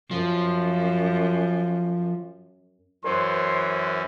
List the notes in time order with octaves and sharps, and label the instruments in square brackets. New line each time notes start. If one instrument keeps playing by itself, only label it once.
[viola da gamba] F#2 [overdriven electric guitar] F3
[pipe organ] F#2 E3 C#4 [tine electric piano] A#4 C5 C#5 [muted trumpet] C6